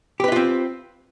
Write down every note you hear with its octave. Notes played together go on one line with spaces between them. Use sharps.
C4 D#4 F4 G4 B4